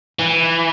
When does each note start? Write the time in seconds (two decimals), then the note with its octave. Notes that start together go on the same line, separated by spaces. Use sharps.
0.19 E3